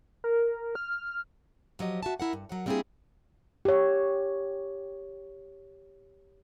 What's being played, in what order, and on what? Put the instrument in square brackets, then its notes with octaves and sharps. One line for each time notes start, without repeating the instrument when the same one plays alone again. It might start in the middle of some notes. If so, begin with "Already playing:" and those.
[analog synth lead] A#4
F6
[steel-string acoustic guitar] F3 F#3 G4 D#5
F#4 E5 A5
E4 A#4 F#5
G2
F#3 A#4 F#5
G3 A#3 C4 D4 E4 G#4
[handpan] G4 C#5